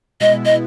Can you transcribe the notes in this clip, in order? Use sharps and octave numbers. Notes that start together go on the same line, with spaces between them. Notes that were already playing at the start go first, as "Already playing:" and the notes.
B2 G#3 B3 E4 D#5
D#5